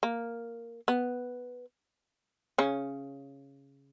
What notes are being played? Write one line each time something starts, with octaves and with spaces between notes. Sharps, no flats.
A#3
B3
C#3 C#4